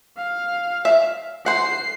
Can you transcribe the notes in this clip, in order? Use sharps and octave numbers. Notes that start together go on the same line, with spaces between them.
F5
E5
C5 F#5 C7